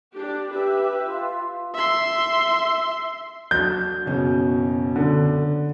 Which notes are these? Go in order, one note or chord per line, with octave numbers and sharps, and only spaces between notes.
D4 G4
G4 B4 E5
F4
E5 C6
F#3 D4 G6
F#1 B2 C#4
D3